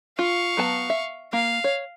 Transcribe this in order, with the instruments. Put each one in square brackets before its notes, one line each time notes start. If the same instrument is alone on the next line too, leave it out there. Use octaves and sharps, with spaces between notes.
[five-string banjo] F4 [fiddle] F5 C#6
[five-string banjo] F#3 B3 A5
E5
[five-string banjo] A#3 [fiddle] F5
[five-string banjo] C#5